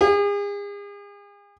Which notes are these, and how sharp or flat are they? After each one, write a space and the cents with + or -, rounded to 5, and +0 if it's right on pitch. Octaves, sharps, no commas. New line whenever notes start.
G#4 -40